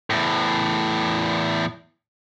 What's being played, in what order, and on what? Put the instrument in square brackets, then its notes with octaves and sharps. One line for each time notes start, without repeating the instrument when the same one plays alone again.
[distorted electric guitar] E2 A2